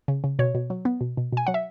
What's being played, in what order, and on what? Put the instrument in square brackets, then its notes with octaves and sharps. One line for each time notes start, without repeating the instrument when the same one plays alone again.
[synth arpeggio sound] C#3
C#3
B2 C#5
B2
F#3
B3
B2
B2
B2 G#5
F#3 F#5
E5